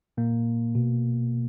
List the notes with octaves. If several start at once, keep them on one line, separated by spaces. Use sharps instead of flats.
A#2 A#3
B2